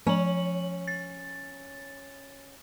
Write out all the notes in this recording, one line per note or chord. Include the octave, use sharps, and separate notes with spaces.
F3 C#4 F#7
A6